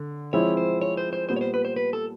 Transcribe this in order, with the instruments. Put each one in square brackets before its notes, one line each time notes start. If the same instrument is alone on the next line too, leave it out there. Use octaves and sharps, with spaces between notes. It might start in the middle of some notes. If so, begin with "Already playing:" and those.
Already playing: [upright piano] D3
[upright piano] F3 G#3 C4 E4 [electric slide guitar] C#5
[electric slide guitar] C5
C#5
C5
C5
[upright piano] A#2 G3 B3 [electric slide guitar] C5
[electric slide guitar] C#5
C5
B4
C5
B4
A4